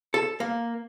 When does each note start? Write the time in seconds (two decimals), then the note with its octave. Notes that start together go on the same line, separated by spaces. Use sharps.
0.14 A4
0.40 A#3